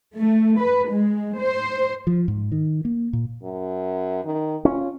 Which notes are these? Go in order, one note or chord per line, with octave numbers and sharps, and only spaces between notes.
A3
B4
G#3
C5
F3
G#2
D#3
A#3
A#2
F#2
D#3
C#4 F4